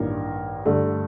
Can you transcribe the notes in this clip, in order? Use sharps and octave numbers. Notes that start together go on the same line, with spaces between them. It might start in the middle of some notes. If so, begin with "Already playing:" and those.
Already playing: A1 G2 D#3 A#3 A#4
G2 D3 A3 D4